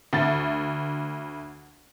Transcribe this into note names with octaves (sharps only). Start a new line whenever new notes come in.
D2 A6